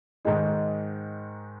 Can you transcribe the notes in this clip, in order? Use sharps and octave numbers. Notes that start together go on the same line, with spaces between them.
G#2 D#3 G#3 D#4